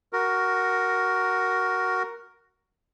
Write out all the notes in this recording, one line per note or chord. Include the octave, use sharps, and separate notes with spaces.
F#4 A#4